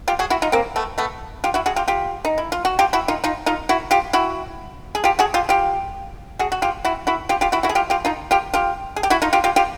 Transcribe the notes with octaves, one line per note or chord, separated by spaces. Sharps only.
F4 G4
F#4 G#4
E4 F#4
D#4 F4
A#3 C4
A3 B3
A3 B3
F4 G4
E4 F#4
F#4 G#4
F4 G4
F4 G4
D#4
E4
F4
F#4
F4 G4
E4 F#4
D#4 F4
D#4 F4
D#4 F4
E4 F#4
F4 G4
E4 F#4
G#4
F4 G4
F#4 G#4
F4 G4
F4 G4
F#4 G#4
F#4
F4 G4
E4 F#4
E4 F#4
F4 G4
F4 G4
E4 F#4
E4 F#4
G#4
F4 G4
F4 G4
D#4 F4
F4 G4
F4 G4
G#4
G4
E4 F#4
D#4 F4
F4 G4
F4 G4
F4 G4